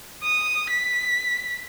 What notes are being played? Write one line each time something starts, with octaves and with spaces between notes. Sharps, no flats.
D#6
B6